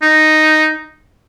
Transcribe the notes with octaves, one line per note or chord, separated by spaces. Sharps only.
D#4